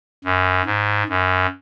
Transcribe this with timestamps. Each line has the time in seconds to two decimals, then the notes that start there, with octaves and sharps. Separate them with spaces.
0.24 F#2
0.66 G#2
1.09 F#2